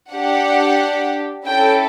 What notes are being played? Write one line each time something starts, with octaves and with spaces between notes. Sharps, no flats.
D4 G4 F#5
C#4 E4 A4 G5